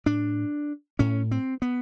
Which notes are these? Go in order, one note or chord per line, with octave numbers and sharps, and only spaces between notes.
A2 D4
A2 C#4
C4
B3